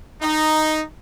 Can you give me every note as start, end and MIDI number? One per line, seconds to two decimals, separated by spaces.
0.22 0.81 63